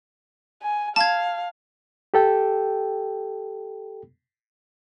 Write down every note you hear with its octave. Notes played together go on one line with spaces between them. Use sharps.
G#5
F5 A5 G#6
G4 A4 G5